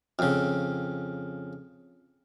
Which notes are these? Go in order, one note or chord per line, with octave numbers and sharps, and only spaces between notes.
F2 C#3